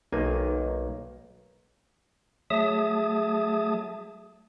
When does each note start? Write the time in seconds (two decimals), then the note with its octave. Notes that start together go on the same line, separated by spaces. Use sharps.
0.13 B1 D#3 A#3 G#5
2.50 F#3 A3 G#4 E5 A5 D#6